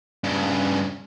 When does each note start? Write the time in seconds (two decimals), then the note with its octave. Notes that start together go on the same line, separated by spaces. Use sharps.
0.24 G2 C#3